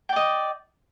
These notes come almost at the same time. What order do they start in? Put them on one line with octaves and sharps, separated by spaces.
G5 D5 D#5